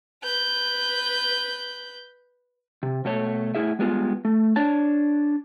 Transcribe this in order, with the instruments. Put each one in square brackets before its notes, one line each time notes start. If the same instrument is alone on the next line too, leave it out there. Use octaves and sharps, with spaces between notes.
[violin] B4 G6
[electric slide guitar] C3
B2 A3 A4 C#5
A2 E4 G#4 E5
G3 G#3 B3 F4
A3
D4 C#5 A5